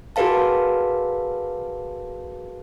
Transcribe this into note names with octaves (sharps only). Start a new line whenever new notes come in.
F#4 G#4 A#4 B4 F5 A5